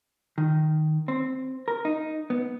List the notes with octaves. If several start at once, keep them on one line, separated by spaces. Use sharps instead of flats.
D#3
C4
A#4
D#4
B3